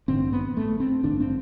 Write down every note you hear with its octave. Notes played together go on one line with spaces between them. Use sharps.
A1 G2 D3 C4
B3
A3
C4
A1 G2 D3 D4
C4